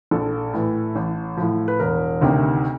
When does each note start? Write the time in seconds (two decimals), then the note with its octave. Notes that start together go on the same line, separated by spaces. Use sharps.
0.11 A#1 A4
0.53 A2 E3
0.95 A1
1.37 A2 F3
1.68 B4
1.79 E1 A#4
2.21 D2 C3 D#3